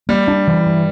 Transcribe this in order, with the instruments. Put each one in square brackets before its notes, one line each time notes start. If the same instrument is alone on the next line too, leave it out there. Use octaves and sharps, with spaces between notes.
[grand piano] G3 [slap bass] A#3
[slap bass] D4
E3
G2